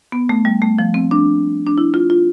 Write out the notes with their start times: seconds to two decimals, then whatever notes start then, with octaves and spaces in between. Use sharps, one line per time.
0.12 B3
0.29 A3
0.45 G3
0.62 A3
0.79 F3
0.94 C4
1.11 D4
1.66 D4
1.78 E4
1.94 F4
2.10 F4